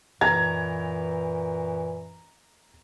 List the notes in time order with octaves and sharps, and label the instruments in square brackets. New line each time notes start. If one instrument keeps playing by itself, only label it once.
[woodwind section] F#2 A#2 E3 [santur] A#5 [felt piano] G#6